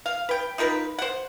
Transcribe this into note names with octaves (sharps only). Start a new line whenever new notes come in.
F5
B4 G5
D#4 F4 A#4 B4
C5 F#5